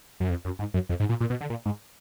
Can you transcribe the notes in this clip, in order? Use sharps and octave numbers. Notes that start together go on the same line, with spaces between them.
F#2
F2
F#2
G#2
F#2
F2
G#2
A#2
A#2
B2
D3
A#2
G#2